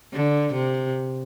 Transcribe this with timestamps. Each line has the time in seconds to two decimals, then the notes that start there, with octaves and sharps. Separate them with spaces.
0.13 D3
0.54 C3